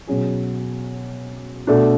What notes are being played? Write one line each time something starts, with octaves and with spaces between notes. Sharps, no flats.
B2 F#3 C#4 G#4
B2 A3 D4